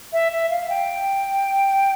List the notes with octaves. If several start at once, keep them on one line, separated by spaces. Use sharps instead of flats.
E5
E5
F5
G5